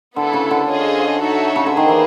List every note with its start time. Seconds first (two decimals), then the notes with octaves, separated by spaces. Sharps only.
0.16 D3 B3 E4 A4
0.33 C#3
0.51 D3
0.68 C#4 F4 G#4 C5 D#5
1.20 D#4 F#4 A4 C#5 E5
1.56 C#3
1.66 D3
1.73 D#3 A#3 D#4 G#4 C5
1.89 E3